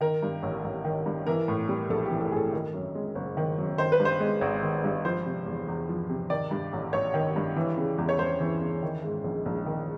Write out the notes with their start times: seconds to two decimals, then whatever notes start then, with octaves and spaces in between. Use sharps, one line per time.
0.01 D#3 A#4
0.23 G2
0.43 A1
0.64 A1
0.85 D#3
1.06 G2
1.26 E3 A#4
1.48 A2
1.69 G3
1.89 A#1 A4
2.06 G4
2.11 E3
2.21 A4
2.32 A2 G#4 A4
2.53 D#3 A#4
2.73 F#2
2.95 G#3
3.15 F#1
3.37 D#3
3.58 F#2
3.78 D#3 C5
3.92 B4
4.00 G2
4.05 C5
4.20 G#3
4.41 G#1
4.62 D#3
4.84 G2
5.05 F3 C5
5.26 C3
5.46 E2
5.68 E2
5.89 F3
6.09 C3
6.30 D#3 D5
6.51 G2
6.73 A1
6.93 A1 C#5
7.14 D#3
7.36 G2
7.56 E3
7.77 C#3
7.98 E2
8.09 C#5
8.19 E2 C5
8.40 E3
8.61 C#3
8.83 D#3
9.04 G#2
9.24 A#1
9.46 A#1
9.66 D#3